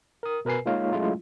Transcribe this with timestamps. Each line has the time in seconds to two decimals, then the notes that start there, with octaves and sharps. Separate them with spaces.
0.23 A#4 D#6
0.45 B2 A#4 B4 G#5 C7
0.66 G#3 A#3 D#4 F4 C#5 F5
0.93 F#3 G#3 A3 C#4 E4 F4